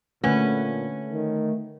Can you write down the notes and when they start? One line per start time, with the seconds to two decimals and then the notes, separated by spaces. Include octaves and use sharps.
0.24 A#2 D3 A3 C#4 B4 F#5
1.13 D#3